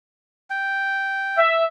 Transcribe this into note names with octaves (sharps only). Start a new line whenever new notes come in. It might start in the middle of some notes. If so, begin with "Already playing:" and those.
G5
E5